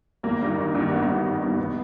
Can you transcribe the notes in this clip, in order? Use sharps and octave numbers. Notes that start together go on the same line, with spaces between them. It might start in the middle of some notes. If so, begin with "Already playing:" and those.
G#1 A#3
G2 D#3
G#1
G2 D#3
G#1 B3
G2 D#3
G#1
G2 D#3
F1 B3